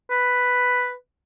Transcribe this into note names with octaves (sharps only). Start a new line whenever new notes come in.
B4